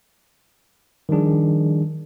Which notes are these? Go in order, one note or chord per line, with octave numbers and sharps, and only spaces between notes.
D#3 F3 G3 D4 G#4